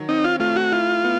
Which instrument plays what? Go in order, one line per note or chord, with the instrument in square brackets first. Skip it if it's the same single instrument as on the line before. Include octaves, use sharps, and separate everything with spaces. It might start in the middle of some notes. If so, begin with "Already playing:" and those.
Already playing: [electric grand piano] D#3 F#3
[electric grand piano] C4 [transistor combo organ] D#4
[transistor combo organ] F4
[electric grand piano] A3 [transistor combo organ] F4
[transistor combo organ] F#4
[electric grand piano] E4 [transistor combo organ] F4
[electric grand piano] B3